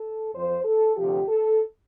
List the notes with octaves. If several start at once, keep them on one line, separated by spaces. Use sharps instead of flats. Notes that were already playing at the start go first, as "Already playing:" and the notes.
Already playing: A4
F2 F3 C5
A4
D2 C3 F3 G4
A4